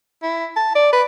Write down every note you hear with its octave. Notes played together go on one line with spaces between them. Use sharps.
E4
A5
D5
B4